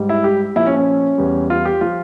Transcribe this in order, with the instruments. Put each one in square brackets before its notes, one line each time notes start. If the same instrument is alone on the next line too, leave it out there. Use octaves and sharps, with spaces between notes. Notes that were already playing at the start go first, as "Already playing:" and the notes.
Already playing: [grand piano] G#2 G3
E4
G4
A#2 F3 E4
C#4
C#4
E2 E3 G3
F4
G4
F3 F4